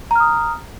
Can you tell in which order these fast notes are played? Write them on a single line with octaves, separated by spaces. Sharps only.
A#5 F6 D#6